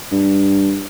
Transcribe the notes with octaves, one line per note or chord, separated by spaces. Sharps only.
G2